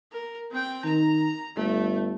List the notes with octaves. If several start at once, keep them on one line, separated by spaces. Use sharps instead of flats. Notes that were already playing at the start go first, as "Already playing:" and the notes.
A#4
C4 G5
D#3 A#5
G1 A3